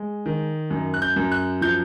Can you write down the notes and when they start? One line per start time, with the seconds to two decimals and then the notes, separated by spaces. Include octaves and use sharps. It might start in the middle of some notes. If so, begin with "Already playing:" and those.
Already playing: G#3
0.26 D#3
0.71 F#2
0.94 F#6
1.02 G6
1.16 F#2
1.32 F#6
1.61 F3 G6